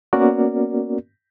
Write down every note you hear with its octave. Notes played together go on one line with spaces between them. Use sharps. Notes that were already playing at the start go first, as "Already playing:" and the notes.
A#3 B3 C#4 F#4 A#4 D5